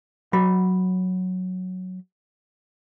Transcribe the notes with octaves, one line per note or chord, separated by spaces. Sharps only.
F#3 B5